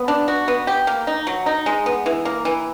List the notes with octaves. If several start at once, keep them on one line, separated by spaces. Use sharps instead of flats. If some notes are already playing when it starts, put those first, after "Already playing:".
Already playing: B3
D4
F#4
B3
G4
A#3
D#4
F#3
D#4
G#3
B3
E3
A#3
E3